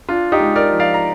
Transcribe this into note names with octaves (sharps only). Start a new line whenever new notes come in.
D4 F4
D#4 G4
G#3
A#4 D5
F3
D5 F5
A#5